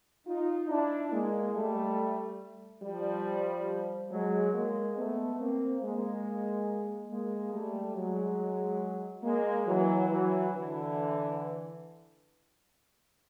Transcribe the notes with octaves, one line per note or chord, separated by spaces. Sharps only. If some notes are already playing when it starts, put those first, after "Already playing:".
D#4 F4
D4 E4
G#3 A#3
G3 A3
F3 G3
F#3 G#3
G#3 A#3
A3 B3
A#3 C4
G#3 A#3
G#3 A#3
G3 A3
F#3 G#3
G#3 A#3
E3 F#3
E3 F#3
D3 E3